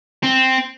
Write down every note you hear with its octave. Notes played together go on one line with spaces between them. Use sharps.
C4